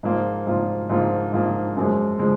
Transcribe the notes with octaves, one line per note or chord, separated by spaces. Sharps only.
G#2 F3 A#3 F4
G#2 F3 A#3 F4
G#2 F3 A#3 F4
G#2 F3 A#3 F4
F#2 F3 G#3
F3 G#3